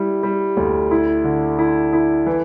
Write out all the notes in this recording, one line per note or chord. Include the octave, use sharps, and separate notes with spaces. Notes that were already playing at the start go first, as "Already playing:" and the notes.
Already playing: G3 E4
G3
D2
E4
D3
E4
E4
E3